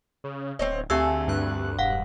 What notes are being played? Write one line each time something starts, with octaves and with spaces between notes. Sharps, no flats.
C#3
D1 C4 C#5 D#5
D2 A3 C4 G4 G#4 G#5 E6
G2 F#6
E1 F5 F#5